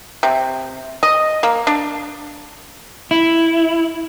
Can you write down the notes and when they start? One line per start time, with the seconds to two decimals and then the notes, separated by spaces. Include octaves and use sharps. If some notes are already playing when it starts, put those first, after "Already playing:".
0.23 C3
1.03 D#5
1.43 A#3
1.67 D4
3.11 E4